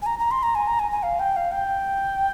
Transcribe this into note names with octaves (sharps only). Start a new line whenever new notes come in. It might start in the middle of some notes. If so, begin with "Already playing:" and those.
G#5
A#5
A#5
C6
A#5
G#5
A#5
G#5
G#5
F5
G5
F5
G5